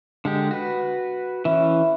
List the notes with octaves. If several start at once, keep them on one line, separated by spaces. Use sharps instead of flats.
D3 G#3 G4
F#4 B4
E3 C#4 E4